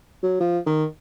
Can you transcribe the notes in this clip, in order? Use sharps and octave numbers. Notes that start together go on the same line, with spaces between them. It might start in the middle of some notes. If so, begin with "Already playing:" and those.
F#3
F3
D#3